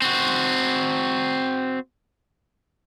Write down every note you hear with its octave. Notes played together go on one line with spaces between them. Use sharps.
C4 F#4